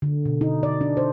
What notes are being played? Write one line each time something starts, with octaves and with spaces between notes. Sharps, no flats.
D3
B2
D#4
D5
D4
C5